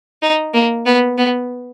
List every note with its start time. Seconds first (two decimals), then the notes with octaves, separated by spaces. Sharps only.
0.22 D#4
0.54 A#3
0.86 B3
1.18 B3